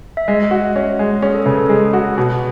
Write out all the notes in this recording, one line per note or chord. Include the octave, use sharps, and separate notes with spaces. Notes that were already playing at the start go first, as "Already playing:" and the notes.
E5
G#3 D#5
F#4
C#4
G#3
C#4 G#4
A4
C#3 B4
A4
G#3 G#4
F#4
B2